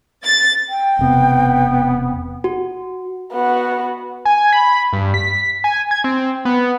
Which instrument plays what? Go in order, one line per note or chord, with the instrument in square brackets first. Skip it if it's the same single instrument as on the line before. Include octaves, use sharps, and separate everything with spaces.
[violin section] A6
[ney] G5
[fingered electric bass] E1 C3 [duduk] B3
[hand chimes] F#4
[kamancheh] B3 F#4
[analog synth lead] G#5
B5
G2
B6
G#5
G#6
C4
B3